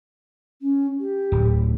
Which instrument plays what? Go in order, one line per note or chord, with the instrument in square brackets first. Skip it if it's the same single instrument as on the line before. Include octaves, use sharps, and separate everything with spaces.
[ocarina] C#4
G4
[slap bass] D1